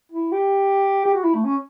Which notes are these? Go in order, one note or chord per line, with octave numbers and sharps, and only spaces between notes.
E4
G4
G4
F#4
E4
A3
C#4